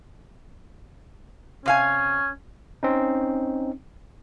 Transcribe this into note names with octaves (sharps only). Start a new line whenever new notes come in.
C3 C#4 F5 G#5
C4 C#4 D#4